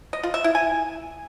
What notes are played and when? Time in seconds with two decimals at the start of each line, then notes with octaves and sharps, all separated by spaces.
0.13 D#5
0.23 F4
0.34 E5
0.44 E4
0.55 G#5